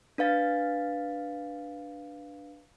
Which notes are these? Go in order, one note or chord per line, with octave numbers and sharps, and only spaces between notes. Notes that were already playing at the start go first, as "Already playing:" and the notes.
D4 B4 F5 A6